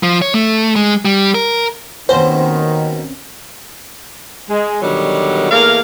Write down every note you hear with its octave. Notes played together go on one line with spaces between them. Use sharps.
F3
C#5
A3
G#3
G3
A#4
D#2 B2 D#3 A#3 C4 C#4 C5
G#3
B2 D3 D#3 F#3 G3
E2 A3 A#3 A#4 F5